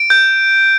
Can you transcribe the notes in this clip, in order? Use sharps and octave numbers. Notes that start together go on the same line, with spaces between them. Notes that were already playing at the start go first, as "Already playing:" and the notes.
Already playing: D7
G6